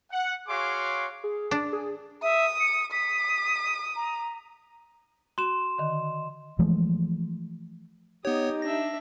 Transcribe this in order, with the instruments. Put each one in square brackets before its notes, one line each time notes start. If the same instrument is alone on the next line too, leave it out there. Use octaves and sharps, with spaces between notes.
[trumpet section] F#5
F#4 G#4 C#5 F5 C6 D6
[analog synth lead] G#4
[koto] D4
[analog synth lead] G#4
[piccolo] E5 [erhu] D#6
[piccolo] C#7
[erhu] D#6 [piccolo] B6
[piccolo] A#5
[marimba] F#4 [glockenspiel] C6 E7
[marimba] D3 D#3
[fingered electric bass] E3 F3 G#3 A3
[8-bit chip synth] B3 C#5 [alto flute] D#4 [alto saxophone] G4 [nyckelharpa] D#6
[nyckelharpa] D4 E5 [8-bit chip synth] A#6